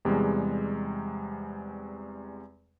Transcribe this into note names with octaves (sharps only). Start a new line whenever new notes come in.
E2 C3 G3 G#3